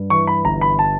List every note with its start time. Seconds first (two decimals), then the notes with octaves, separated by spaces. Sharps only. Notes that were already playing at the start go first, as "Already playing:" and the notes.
Already playing: G2
0.10 E3 C#6
0.27 B5
0.45 G1 A#5
0.61 B5
0.79 A5